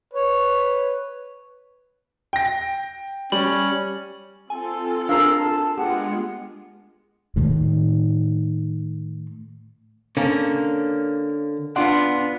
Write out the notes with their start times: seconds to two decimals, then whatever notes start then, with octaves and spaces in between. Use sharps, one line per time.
0.14 B4 C#5
2.33 G5 A#6
3.32 G3 C#4 F#7
4.50 C4 F4 A4 G#5
5.09 D4 G#4 A#4 F5 E6
5.38 A5
5.78 G#3 B3 F4 G4 F#5
7.36 A2 D#3
10.17 D3 A#3 C#4
11.76 B3 D4 F4 D5 F#5 C6